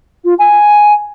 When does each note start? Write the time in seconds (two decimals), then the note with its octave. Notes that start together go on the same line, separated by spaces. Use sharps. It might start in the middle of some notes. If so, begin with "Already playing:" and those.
0.25 F4
0.39 G#5